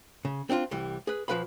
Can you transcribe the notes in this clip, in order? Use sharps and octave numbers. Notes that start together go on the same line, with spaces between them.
C#3
C4 D4 E4 F4
C2 E3 G3
G#4 B4
B1 F3 C#4 B4 F5 B5